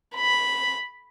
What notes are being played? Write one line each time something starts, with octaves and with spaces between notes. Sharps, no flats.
B5